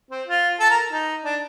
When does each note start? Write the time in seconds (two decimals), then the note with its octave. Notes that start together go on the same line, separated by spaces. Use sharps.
0.11 C4
0.27 F4
0.60 A4
0.70 A#4
0.92 D#4
1.25 D4